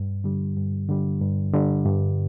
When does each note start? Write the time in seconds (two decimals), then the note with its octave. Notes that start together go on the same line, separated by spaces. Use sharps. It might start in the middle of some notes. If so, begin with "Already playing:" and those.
Already playing: G2
0.24 D3 G3
0.57 G2
0.89 D3 G3
1.22 G2
1.53 D3 G3
1.85 G2